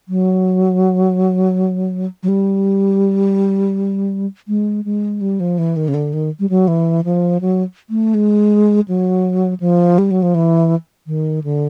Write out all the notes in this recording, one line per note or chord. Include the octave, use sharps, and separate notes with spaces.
F#3
F#3
G3
G#3
G#3
G3
F3
E3
D#3
C#3
D3
D#3
G3
F#3
E3
F3
F#3
A3
G#3
F#3
F3
G3
F#3
F3
E3
D#3
D3